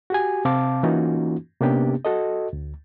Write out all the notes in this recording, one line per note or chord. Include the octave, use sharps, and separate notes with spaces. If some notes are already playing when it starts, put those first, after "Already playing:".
F#4 G4 G#5
C3 C4 F5 A5 D6
E3 A#3 C#4 D#4 F4 F#4
C3 A#3 B3 C#4 D4 G4
F#4 A4 D#5
D2